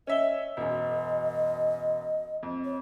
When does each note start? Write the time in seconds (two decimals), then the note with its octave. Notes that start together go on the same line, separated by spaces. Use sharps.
0.07 C#4 D#5 E5 G7
0.57 E1 F#2 D#5
2.43 F2
2.65 C#5